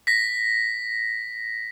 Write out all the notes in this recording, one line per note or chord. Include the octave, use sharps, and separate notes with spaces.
A#6 B6